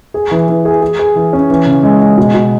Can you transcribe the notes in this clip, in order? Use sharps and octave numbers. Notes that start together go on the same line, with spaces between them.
G#4
E3
E3
G#4
G#4
G#4
E3
C#4
E3
C#3
G#3
G#3
B2
B2